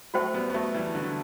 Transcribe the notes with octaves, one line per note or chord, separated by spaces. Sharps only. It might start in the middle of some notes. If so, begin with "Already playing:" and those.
F#3 A3 F#4 C5 G5
G3 B3
B3
F#3 A3
E3 G3
D3 F#3